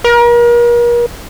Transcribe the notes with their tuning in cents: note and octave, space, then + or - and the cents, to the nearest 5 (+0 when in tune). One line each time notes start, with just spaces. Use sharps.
A#4 +40